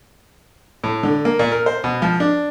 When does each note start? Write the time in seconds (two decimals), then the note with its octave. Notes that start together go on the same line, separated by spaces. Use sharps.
0.84 A2
1.03 D3
1.25 A#3
1.39 A#2
1.52 A#4
1.66 C5
1.84 B2
2.02 F3
2.20 D4